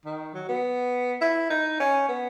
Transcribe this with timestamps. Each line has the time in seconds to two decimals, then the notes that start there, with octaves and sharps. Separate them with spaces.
0.05 D#3
0.34 F#3
0.49 B3
1.22 E4
1.50 D#4
1.80 C#4
2.09 B3